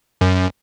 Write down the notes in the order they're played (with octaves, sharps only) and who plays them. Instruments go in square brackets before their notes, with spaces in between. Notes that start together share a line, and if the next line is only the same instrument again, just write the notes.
[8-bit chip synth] F#2